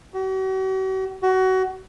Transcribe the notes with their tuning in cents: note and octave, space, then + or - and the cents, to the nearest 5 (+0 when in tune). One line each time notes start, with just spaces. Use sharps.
F#4 +45
F#4 +25